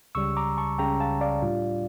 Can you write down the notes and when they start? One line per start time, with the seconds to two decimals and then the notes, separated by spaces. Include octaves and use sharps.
0.15 C#2 C#3 G3 C#6 E6
0.37 A#5 D6
0.58 A5 C#6
0.78 C#2 C#3 G3 G5 A#5
1.00 F5 A5
1.21 D5 F5
1.42 A2 G3 D4 F4